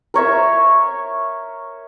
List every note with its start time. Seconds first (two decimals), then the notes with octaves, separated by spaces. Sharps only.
0.14 A#4 C#5 E5